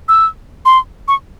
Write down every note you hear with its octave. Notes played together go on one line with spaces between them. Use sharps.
E6
C6
C#6